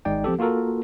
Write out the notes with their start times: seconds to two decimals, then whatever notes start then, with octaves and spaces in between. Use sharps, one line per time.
0.05 G#1 G#3 D#4 D5 G5
0.24 F3 C4 G4 A4
0.39 A#3 F4 F#4 A4 A#4